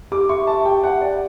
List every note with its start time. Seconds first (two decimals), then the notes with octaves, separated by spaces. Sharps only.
0.12 G4 D6
0.29 E5 C#6
0.47 E5 A5
0.65 G4 G5
0.83 E5 F#5
1.01 D5 E5